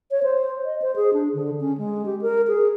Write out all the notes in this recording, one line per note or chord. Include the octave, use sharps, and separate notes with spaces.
C#5
C5
D#5
C5
G#4
D4
D3
C#4
G#3
G4
A#4
G#4